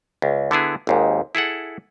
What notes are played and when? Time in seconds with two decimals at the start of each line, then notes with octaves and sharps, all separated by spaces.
0.22 C#2
0.51 D3 B3 E4 G#4
0.87 G#1 D#2 G#2
1.35 E4 G#4 A4 F#5